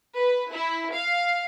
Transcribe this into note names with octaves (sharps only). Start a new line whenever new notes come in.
B4
E4
F5